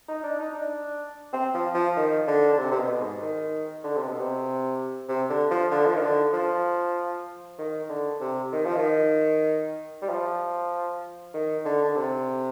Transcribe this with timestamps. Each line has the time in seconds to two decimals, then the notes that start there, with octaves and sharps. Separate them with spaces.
0.08 D#4
0.24 D4
0.40 D#4
0.55 D4
1.33 C4
1.54 F3
1.75 F3
1.97 D#3
2.28 D3
2.53 D3
2.58 C3
2.71 C3
2.79 B2
3.00 G#2
3.22 D#3
3.84 D3
3.96 C3
4.08 B2
4.20 C3
5.09 C3
5.30 D3
5.51 F3
5.71 D3
5.86 F3
5.95 D#3
6.02 D3
6.33 F3
7.59 D#3
7.89 D3
8.21 C3
8.52 D#3
8.65 F3
8.77 D#3
10.02 G3
10.10 F3
11.34 D#3
11.65 D3
11.84 D3
11.96 C3